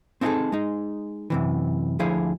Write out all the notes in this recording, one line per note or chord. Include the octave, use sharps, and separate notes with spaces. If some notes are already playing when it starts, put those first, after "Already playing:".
C4 D#4 E4 F#4 G#4 A4
G#3 D#4
F#2 C3 E3
D2 D3 F3 E4 G#4 F5